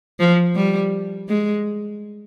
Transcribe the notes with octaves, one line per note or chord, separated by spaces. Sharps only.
F3
G3
G#3